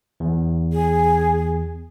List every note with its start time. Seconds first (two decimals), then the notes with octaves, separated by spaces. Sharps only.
0.20 E2
0.72 G#4